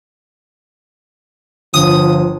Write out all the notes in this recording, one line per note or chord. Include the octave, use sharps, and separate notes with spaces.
G1 F3 D#6